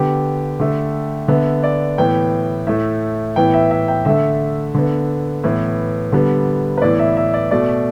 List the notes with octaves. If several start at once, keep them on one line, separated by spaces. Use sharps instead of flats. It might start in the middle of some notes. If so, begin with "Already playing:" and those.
Already playing: D3 B3 G4
D3 A3
D3 B3 E5
D5
A2 E3 B3 G5
A2 A3 E5
A2 E3 B3 G5
E5
E5
G5
D3 A3 E5
D3 B3
A2 E3 B3
D3 G3 B3
B4
A2 E3 B3 D5
E5
E5
D5
B2 A3 D5